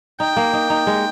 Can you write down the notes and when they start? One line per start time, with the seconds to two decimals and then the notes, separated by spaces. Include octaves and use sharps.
0.20 D#4 G5
0.37 A#3
0.53 D#4
0.70 D#4
0.87 G#3